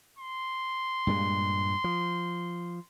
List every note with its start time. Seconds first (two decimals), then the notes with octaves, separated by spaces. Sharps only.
0.19 C6
1.07 G2 A#2 G#3
1.84 F3